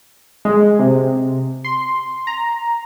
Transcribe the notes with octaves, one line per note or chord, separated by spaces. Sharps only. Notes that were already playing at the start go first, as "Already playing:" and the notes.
G#3
C3
C6
A#5